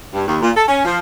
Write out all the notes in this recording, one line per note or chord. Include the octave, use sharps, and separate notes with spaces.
G2
D#2
A#2
A4
C#4
F3